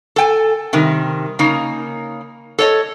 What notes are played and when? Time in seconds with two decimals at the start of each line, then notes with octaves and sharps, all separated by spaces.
0.16 A4 G5 G#5
0.73 C3 D#3 G3
1.39 C#3 A#3 D#4
2.59 A4 C#5 D#5